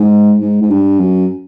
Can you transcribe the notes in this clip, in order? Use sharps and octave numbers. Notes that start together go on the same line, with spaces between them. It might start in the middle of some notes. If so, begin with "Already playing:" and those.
Already playing: G#2
G#2
G#2
G2
F#2